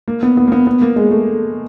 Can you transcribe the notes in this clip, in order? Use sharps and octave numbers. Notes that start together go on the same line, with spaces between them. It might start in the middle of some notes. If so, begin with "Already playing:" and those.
A#3
B3
B3
A#3
B3
B3
A#3
G#3
A3